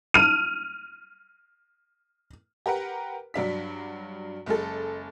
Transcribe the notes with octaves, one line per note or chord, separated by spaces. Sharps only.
F6 D#7
G4 A#4 B4 F#5
G2 F#3 D4 B6
F#1 G#3 A4